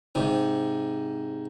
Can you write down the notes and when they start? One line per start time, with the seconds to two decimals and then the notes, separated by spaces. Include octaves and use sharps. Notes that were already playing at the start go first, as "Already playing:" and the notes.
0.15 G#2 C3